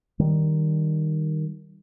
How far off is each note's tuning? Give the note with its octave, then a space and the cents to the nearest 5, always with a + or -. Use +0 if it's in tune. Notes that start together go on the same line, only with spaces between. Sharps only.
D#3 +0 G3 +0